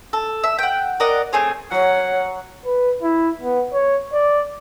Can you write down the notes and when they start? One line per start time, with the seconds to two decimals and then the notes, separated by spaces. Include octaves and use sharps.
0.13 A4
0.44 E5
0.59 F#5 G5
1.00 A#4 D5 D#5 F#5
1.33 A3 C4 G#4 C#5
1.72 F#3 C#5 F#5
2.65 B4
3.02 E4
3.41 B3
3.73 C#5
4.13 D5